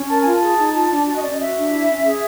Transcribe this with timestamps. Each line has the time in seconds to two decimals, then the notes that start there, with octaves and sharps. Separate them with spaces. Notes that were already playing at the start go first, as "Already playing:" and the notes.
Already playing: C#4
0.09 A#4 A5
0.21 F4 G#5
0.35 A5
0.41 G#4
0.58 D#4
0.74 F4
0.91 D4
1.07 F#4 A5
1.16 D#5
1.23 C#4 D5
1.32 D#5
1.40 F#4 E5
1.56 D4
1.72 E4
1.88 C#4
2.04 G#4